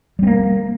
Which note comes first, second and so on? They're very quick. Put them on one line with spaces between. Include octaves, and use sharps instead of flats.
G3 C4 A#3